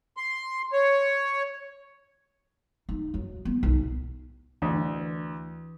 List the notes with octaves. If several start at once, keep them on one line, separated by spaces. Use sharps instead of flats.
C6
C#5
D#4
F#3
B3
B1
D2 E3